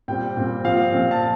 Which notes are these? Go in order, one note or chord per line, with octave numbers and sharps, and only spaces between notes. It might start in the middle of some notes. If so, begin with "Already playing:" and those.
A#2 G3 C4 G5
A#2 G3 C4
A#2 F3 C4 F5
A#2 F3 C4
A5